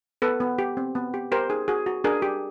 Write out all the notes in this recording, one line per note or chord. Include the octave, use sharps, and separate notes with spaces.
B3 A4 B4
B3
G4
C4
B3
G4
G4 A#4 C5
D#4 G#4
F#4 G#4
F#4
D4 G#4 A#4
G4